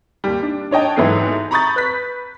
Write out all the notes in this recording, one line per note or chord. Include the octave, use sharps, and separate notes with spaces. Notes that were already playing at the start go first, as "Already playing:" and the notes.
D#2 G3
D4
D4 C#5 D#5 G5 A5
G#2 E3 F#3 B3 A4 C7
A#5 B5 C#6 D#6 G6 A6
B4 F#6 B6